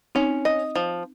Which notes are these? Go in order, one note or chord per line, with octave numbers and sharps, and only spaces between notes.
C4 C#4 D#4
D#5
F3